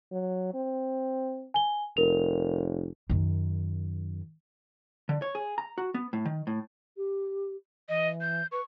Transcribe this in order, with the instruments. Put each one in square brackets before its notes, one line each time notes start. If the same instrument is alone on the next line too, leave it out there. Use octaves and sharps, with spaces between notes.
[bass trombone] F#3
C4
[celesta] G#5 G7
[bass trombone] F1 [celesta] A#4 F7
[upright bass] F#2 D#3
[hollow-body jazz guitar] D3
C#5
G#4
A#5
F#4
B3
A2
D#3
A2
[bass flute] G4
[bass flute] E3 [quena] D#5
[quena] G6
[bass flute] B4 [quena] C#6